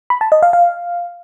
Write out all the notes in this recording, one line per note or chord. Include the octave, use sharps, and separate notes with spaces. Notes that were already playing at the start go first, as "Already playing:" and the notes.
B5
A5
D#5
F5
F5